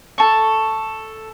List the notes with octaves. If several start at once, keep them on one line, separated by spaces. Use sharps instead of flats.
A4 C#6